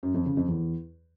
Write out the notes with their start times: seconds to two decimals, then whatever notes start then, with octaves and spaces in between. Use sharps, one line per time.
0.03 F#2
0.14 F2
0.26 C#3
0.37 F2
0.48 E2